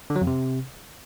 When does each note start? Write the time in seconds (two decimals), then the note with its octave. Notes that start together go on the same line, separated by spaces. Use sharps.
0.10 D3
0.16 F#3
0.21 F2
0.27 C3